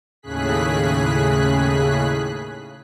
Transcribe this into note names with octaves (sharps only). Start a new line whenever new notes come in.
D#2 A2 C#3 G#4 F#6 B6